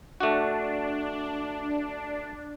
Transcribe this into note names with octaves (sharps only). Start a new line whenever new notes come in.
A3 D4 F#4